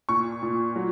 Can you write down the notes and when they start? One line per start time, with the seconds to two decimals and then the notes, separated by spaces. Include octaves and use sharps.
0.09 A#2 C#6
0.42 A#2
0.76 F#3